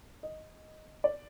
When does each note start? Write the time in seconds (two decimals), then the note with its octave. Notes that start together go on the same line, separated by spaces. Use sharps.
0.23 D#5
1.04 D5